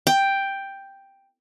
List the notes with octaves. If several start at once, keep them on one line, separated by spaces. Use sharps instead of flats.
G5